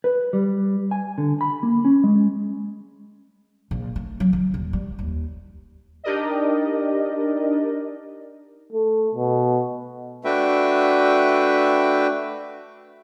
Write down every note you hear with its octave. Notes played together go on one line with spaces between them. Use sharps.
B4
G3
G#5
D3
B5
A#3
C#4
G#3
A#1
A3
F#3
D#3
D#1
G3
D#2
D4 D#4 G4 A#4 D5 D#5
A3
B2
A3 D4 F#4 B4 E5 G5